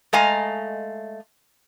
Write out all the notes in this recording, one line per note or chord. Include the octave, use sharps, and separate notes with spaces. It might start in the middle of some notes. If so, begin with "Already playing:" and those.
G#3 A3 D#5 F5 G#5 A#5